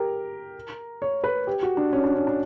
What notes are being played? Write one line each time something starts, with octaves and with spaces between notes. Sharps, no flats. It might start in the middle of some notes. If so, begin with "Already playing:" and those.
Already playing: G4 A#4
C#5
B4
G4
F#4
D4
C#4
D4
C#4
D4